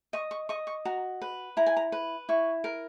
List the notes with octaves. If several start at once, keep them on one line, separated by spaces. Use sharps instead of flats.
D#5 C#6
C#6
D#5 C#6
C#6
F#4 A#5
B4
E4 A#5
G#5
A#5
B4
E4 C#6
A#4